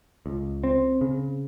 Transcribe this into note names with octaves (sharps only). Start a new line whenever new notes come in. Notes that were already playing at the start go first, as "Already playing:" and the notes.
C#2
C4
C#3